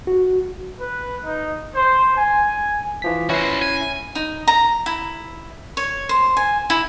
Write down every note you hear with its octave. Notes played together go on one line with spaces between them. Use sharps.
F#4
B4
D#4
C5
G#5
E3 F3 B6
C#4 E4 F#4 C5 A#6
G#5
D#4
A#5
E4
C#5
C5
G#5
E4